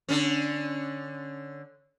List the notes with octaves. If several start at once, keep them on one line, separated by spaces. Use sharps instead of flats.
D3 C#4